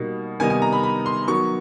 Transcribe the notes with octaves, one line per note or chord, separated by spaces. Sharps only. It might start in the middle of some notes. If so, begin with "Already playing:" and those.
Already playing: B2 G3 A#3 D#4
C3 D#3 G3 B3 D#4 G#5
G#5
A#5
B5
B5
C6
D#3 F#3 B3 C#6